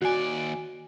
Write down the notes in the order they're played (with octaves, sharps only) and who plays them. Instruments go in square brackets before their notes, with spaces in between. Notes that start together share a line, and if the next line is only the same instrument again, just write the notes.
[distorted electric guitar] D#2 D5 [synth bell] F#4 G#5